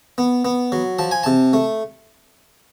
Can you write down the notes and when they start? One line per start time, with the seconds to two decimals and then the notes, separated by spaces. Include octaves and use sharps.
0.18 B3
0.45 B3
0.72 F#3
0.99 F3 A5
1.11 G#5
1.23 C3 A5
1.53 A3